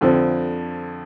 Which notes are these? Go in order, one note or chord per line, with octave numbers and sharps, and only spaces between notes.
F2 D3 F3 C4